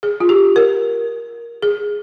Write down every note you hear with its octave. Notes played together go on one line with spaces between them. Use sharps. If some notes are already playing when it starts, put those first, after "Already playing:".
G#4
F4
G4
A#4
G#4